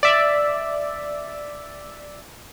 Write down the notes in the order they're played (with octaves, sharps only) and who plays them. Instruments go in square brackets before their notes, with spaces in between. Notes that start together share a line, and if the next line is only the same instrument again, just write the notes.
[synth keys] D5 E5